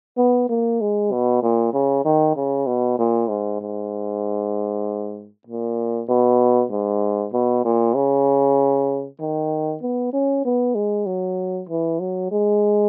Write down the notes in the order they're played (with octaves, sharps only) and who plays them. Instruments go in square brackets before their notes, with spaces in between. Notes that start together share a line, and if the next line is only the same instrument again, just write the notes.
[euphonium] B3
A#3
G#3
B2
A#2
C#3
D#3
C#3
B2
A#2
G#2
G#2
A#2
B2
G#2
B2
A#2
C#3
D#3
B3
C#4
B3
G#3
F#3
E3
F#3
G#3